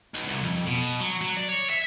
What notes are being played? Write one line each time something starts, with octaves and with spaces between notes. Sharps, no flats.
B1
C2
F2
B2
F#3
F#3
D5
C#5
E5